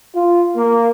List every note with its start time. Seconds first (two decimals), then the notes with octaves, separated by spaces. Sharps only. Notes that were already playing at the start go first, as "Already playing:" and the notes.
0.14 F4
0.56 A#3